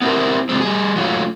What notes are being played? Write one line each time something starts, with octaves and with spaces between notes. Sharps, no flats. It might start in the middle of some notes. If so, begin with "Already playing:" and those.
B3 C4 E4 G4 A#4 C5
C3 F3 G#3 C4
G3 G#4
F#3 A3 C#4 F4